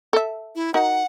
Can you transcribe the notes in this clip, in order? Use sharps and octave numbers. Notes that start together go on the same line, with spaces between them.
A4 E5
E4
D#4 F#4 A#4 F#5